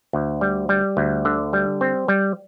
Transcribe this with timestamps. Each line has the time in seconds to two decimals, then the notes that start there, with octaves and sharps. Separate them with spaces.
0.13 D2
0.41 G3
0.69 G3
0.97 D2
1.25 D3
1.53 G3
1.81 C4
2.08 G3